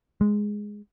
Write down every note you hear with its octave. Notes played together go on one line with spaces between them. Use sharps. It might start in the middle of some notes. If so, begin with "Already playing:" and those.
G#3